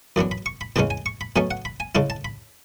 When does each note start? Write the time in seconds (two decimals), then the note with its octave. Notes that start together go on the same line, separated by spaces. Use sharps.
0.16 F#2 E3 B3 D4
0.31 B5
0.46 C#6
0.61 B5
0.76 E2 C#3 E3 G#3 C#4 A5
0.90 G#5
1.06 C#6
1.21 B5
1.36 B2 F#3 A3 C#4 G#5
1.51 F#5
1.65 B5
1.80 G#5
1.95 C#3 G#3 C#4 E4 A5
2.10 A5
2.25 B5